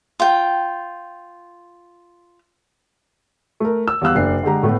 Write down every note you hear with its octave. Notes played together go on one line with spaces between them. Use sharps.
F4 G5
A3 A#4
E6
E2 G3 F5 E6 F#6
F#1 D4 C7
D3 G#3 G4 A#5
A2 A3 B3